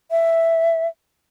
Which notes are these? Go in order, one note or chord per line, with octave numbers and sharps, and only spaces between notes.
E5